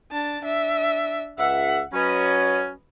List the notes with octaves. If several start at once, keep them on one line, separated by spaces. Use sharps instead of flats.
D4 A5
D4 E5
C#2 E5 F#5
F#3 C#4 B4 D#5